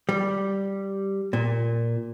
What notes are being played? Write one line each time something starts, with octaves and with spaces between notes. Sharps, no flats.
G3
A#2